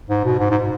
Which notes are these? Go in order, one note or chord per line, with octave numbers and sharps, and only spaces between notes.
G#2
B2
G#2
G#2